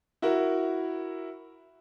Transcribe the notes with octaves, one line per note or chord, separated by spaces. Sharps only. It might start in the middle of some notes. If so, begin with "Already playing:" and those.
E4 F#4 A#4